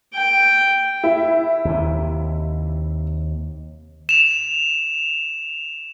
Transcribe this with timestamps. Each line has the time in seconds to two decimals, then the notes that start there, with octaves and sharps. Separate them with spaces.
0.14 G5
1.03 E4
1.65 D#2 C3
4.09 E7 F7